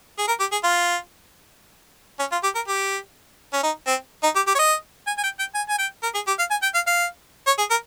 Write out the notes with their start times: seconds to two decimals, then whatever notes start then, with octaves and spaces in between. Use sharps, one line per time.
0.18 G#4
0.28 A#4
0.40 G4
0.52 G#4
0.64 F4
2.19 C#4
2.32 F4
2.43 G4
2.55 A#4
2.68 G4
3.53 C#4
3.63 D#4
3.87 C4
4.23 D#4
4.36 G4
4.47 G4
4.55 C#5
4.59 D#5
5.07 G#5
5.18 G#5
5.23 G5
5.39 G5
5.54 G#5
5.69 G#5
5.79 G5
6.03 A#4
6.14 G#4
6.27 G4
6.39 F5
6.51 G#5
6.62 G5
6.74 F5
6.87 F5
7.47 C#5
7.58 G#4
7.70 A#4